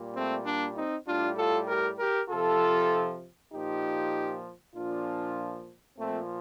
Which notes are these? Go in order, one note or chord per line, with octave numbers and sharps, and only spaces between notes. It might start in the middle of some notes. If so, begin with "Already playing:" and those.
Already playing: A#2 G3
A3 C4
A#3 D4
C4 D#4
A2 G3 D4 F4
F4 A4
G4 A#4
G4 A#4
C3 F3 F4 A4
A#2 F3 D#4 G4
A#2 F3 D4 F4
A#2 F3 A3 C4